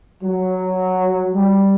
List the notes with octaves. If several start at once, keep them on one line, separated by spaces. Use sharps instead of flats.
F#3
G3